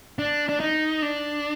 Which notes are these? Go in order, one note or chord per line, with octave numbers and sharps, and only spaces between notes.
D4
D4
D#4
D4